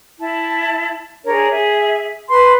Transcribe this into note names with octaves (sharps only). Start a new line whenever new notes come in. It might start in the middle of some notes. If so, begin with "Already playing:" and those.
E4 A5
D4 G#4 A#4 C#5
G#4 E5
B4 C6